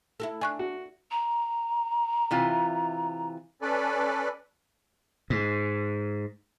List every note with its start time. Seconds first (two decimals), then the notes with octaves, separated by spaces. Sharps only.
0.20 E4 F#4 A4
0.41 D4 G#5 C#6 F#6
0.59 F#4
1.11 A#5
2.31 C3 E3 F4
3.62 C#4 A4 B4 D5
5.30 G#2